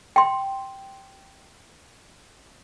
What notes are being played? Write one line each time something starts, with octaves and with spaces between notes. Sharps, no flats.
G5 C6